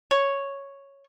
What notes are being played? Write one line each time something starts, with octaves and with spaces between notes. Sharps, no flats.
C#5